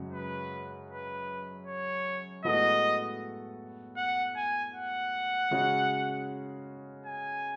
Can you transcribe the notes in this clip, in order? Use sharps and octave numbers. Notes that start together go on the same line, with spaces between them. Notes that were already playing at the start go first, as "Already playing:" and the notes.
Already playing: F#2 C#3 G#3 C#4 F#4
B4
B4
C#5
A2 G#3 B3 F#4 A4 D#5
F#5
G#5
F#5
C#3 G#3 C#4 F#4
G#5